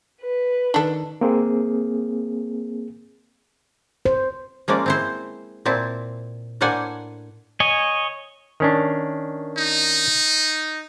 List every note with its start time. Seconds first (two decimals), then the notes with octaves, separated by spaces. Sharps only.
0.22 B4
0.74 D#3 D4 D#4 A4
1.21 A#3 C4 G#4
4.05 C5
4.68 F3 G#3 A#3 C#4 D5
4.86 C4 E4 C5
5.65 A#2 C4 E4 A5
6.61 A2 A#3 D4 C5 F#5 G#5
7.60 C#5 D#5 G#5
8.60 D#3 C#4 D4
9.58 D#4